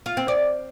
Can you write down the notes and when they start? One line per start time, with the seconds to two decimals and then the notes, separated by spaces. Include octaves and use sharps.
0.06 F4
0.17 C4
0.28 D5